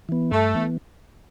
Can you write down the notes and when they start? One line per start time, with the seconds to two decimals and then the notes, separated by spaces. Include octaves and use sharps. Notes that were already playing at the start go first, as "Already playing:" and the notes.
0.09 E3 B3
0.32 G2 A3
0.55 E3 B3